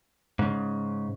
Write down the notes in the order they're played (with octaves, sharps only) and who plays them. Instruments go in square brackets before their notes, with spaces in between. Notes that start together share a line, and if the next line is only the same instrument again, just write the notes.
[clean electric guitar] G#2 C#3